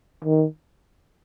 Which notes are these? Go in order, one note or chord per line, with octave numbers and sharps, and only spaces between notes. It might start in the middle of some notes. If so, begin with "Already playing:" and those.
D#3